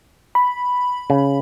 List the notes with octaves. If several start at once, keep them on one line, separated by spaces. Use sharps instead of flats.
B5
C#3